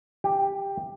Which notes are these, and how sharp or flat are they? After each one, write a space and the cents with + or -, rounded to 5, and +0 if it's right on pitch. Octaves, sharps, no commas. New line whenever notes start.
G4 +10